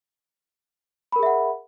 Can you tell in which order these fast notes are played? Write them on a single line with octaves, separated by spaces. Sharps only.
B5 A#4 G#4 E5 F#5